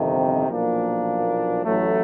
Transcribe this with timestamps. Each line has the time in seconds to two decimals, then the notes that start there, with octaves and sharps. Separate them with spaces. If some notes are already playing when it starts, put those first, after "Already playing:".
Already playing: G1 F2 C3 D#3
0.48 B1 A#2 F3 A#3 D4
1.64 A1 A2 F#3 A3